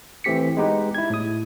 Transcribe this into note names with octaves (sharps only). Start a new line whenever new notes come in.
E3 A3 C4 G4 B6 C#7
G#3 B3 D#4 G4 B4
E4 G#6
A2 D#6